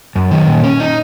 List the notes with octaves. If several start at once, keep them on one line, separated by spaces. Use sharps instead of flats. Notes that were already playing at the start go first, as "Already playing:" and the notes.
F#2
D#3
A#2
C#4
D#4